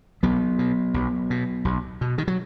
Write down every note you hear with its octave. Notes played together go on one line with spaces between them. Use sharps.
B1 F#3 B3
B2
B1
B2
B1
B2
D#3
F#3